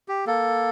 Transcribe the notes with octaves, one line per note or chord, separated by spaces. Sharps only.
G4
A#3 A4